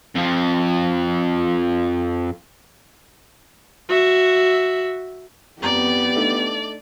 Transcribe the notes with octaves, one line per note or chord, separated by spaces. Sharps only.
F2 F3
F#4 E5
F2 B3 G4 D5 A#5
A3 D4 D#4